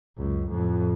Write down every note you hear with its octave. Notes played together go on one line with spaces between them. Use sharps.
C#2 F#2
F2 A2